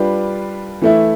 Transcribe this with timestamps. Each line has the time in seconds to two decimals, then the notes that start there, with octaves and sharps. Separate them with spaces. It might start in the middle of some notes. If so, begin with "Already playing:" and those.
Already playing: G3 D4 F4 B4
0.82 E3 A3 E4